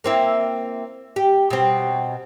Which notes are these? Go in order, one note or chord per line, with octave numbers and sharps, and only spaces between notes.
A#3 C4 E4
G4
B2 C4